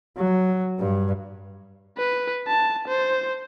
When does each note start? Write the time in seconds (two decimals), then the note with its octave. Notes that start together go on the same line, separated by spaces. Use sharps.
0.17 F#3
0.79 G2
1.98 B4
2.47 A5
2.88 C5